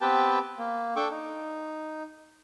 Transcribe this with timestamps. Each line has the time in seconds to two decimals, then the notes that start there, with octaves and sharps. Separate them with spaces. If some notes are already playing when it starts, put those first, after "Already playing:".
0.01 B3 C4 G4 B4 G5 A5
0.58 A#3
0.96 D4 A4 G5 C#6 D6
1.11 D#4